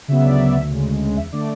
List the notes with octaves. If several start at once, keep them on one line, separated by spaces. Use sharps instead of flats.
C#3 F#3 B3 E5
D2 D5
C#3 F#3 B3 E5
D2
C#3 G#3
D2
C#3 G#3
E2 E5
D3 A3 D5